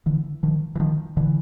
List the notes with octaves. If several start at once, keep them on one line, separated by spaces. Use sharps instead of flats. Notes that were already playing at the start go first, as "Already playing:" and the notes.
D3 E3
D#3 F3
E3
D#3 F3
D3 E3